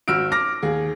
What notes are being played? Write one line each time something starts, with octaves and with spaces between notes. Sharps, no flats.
G#1 F#4 E6 F6 D7
D6 F6 A#6
D#2 G#4